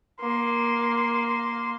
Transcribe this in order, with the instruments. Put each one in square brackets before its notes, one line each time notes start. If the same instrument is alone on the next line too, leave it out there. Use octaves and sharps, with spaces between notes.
[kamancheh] A#3 C6